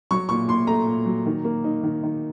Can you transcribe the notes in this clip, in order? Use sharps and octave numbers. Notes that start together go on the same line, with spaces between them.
F#3 C#6
A#2 C#6
A#2 C6
A3 A#5
A#2
F#3
D#3
A#3
D#4
D#3
D#3